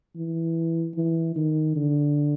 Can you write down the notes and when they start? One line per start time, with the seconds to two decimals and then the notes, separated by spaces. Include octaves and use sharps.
0.16 E3
0.96 E3
1.36 D#3
1.76 D3